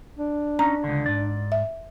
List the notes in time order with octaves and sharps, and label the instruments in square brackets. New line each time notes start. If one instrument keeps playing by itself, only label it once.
[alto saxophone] D4
[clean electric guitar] C#4 D#4 [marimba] A#5
[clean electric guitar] C#2 D3
G#2 D5
[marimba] E5